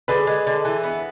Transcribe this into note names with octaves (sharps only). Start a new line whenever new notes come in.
D3 G#4 B4
G#3
D3
E3
B3